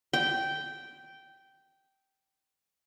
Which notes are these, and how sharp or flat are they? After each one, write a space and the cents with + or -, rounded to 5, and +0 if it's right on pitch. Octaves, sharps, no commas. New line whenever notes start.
G5 -10